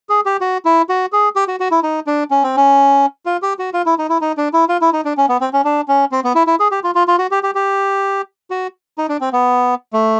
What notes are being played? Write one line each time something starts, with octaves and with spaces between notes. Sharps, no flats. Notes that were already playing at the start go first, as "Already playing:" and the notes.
G#4
G4
F#4
E4
F#4
G#4
G4
F#4
F#4
E4
D#4
D4
C#4
C4
C#4
F4
G4
F#4
F4
E4
D#4
E4
D#4
D4
E4
F4
E4
D#4
D4
C#4
B3
C4
C#4
D4
C#4
C4
B3
E4
E4
G#4
G4
F4
F4
F4
F#4
G4
G4
G4
F#4
D#4
D4
C4
B3
A3